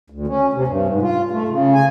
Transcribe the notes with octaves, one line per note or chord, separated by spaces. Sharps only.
D2
C#4
C3
G2
G#2
F4
A3
C#3
G#5